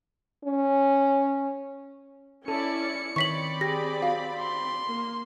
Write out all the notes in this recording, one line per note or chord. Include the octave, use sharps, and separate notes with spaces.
C#4
C#4 E4 A4 D5 C#7
D#3 C4 C#5 D5 B5 C#6 B6 F#7
G4 G#4 A#6
F#4 F5
C6
A#3